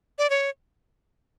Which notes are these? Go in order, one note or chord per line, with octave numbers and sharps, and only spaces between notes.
D5
C#5